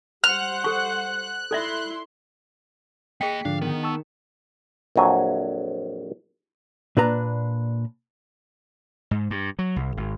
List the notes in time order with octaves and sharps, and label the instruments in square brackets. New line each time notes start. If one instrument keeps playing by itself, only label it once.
[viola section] G3 C5 F#5 [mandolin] F6 [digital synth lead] F#6
[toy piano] A4 C#6
[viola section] E4 C6 [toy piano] A4 D5 E5
[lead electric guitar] A#3 D#5 [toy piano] G#4 G5 [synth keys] B6 C#7
[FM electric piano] G#2 D3 F3 [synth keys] D4 [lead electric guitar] F5
[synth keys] D#3 [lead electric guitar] B3
[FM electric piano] A5 C#6 E6
[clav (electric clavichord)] A#1 F2 F#3 G#5
[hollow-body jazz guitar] A#2 D4 B4 A#5
[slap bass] G#2
G2
F#3
C2
G#1